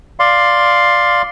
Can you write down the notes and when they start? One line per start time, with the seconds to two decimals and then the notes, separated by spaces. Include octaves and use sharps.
0.20 D5 F5 C6